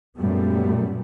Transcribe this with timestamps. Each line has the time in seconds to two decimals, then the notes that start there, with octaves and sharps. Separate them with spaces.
0.16 F#2 A#2 G3 A3 B3